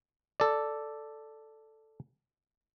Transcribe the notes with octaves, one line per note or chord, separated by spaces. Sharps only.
A4 D5